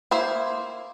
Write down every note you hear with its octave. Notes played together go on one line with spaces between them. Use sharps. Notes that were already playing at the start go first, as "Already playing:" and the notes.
A#3 E4 C5